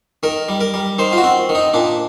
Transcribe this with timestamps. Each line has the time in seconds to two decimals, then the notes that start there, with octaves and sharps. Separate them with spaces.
0.23 D#3 A#4
0.49 G3
0.61 A#4
0.74 G3
0.99 D#3 C5
1.13 F4
1.18 F#4
1.24 C4
1.49 D#3
1.55 D#4
1.74 A#2 D4